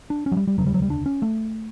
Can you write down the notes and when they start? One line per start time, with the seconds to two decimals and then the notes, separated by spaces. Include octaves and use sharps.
0.10 D4
0.26 C#4
0.32 F#3
0.37 G3
0.47 G3
0.58 E1 D2 C#3 F#3
0.66 G3
0.74 F#3
0.82 G3
0.90 D4
1.06 C#4
1.22 A3